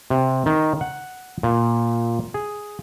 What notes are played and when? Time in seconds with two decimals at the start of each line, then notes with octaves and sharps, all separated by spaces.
0.10 C3
0.46 D#3
0.81 F#5
1.43 A#2
2.34 G#4